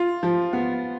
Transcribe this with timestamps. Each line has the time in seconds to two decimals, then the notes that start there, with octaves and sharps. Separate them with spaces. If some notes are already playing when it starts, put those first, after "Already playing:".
Already playing: F4
0.23 F3
0.53 B3